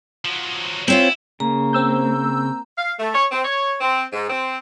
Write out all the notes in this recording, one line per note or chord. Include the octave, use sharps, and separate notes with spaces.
F3 F#3
C4 C#4 E4 F4
C#3 A#3 A#5
C4 E6 G6
F5
A3
C#5
C4
C#5
C4
G#2
C4